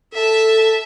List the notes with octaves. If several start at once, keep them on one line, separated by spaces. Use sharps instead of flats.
A4 E5 A5